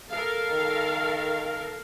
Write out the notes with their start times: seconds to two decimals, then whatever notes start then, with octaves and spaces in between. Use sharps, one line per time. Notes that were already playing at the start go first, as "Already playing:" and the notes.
0.11 A4 A#4 F5
0.50 D#3